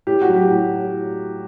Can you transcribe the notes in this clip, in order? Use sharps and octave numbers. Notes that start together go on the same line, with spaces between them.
A2 G4
F#4
F#3
G4
A2